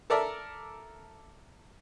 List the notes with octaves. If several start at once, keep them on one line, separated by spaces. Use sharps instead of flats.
A4 A#4 D5 E5 A5